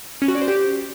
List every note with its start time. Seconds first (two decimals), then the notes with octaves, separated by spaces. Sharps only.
0.22 C#4
0.28 F#4
0.35 D5
0.41 C5
0.48 G4